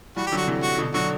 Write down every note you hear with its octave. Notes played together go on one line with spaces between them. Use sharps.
E3 G3 F#4
G4
D3 F#3
F#4
C3 E3
F#4
B2 D3
D3 F#3 F#4